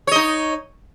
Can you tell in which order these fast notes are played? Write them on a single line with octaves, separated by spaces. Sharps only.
C#5 D#5 D#4